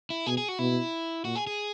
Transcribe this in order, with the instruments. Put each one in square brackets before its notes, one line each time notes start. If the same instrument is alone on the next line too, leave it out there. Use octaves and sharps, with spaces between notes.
[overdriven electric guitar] E4
[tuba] B2 [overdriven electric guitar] G#4
[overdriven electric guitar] G#4
F#4
[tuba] B2 [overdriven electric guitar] E4
[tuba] A#2 [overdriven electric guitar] F#4
[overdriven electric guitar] G#4
G#4